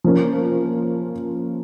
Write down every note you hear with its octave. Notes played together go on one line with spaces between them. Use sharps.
F3 A#3 C#4